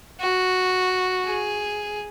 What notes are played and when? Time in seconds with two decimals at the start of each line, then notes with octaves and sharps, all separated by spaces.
0.21 F#4
1.25 G#4